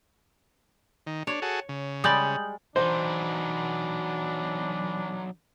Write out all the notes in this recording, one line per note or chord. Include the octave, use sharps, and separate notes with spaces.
D#3
D4 C#5
F#4 G#4 A4
C#3
G3 G#3 D5 D#6 G6 F#7
E3 F#3 D4 D#4 C5